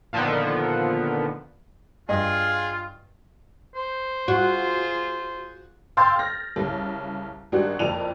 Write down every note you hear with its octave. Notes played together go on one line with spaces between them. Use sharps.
A#2 D3 D#3 F3 B3
G2 F4 G#4 D#5
C5
F4 F#4 G#4
F5 G5 C6 E6 G6 A6
F6 A#6
C2 C#3
G#1 G3 D4 F#4
F#1 F2 D5 D#7 F7